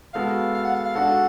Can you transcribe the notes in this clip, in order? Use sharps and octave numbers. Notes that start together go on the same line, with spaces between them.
G#3 B3 F#4 A4 F5
F5
F#5
F5
F5
G#3 D4 F#4 A4 F#5